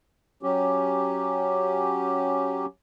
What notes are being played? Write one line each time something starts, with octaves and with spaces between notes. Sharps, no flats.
F#3 C#4 G4